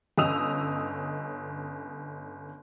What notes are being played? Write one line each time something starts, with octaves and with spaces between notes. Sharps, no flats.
G1 C#4 D#5 D#6 E6 F7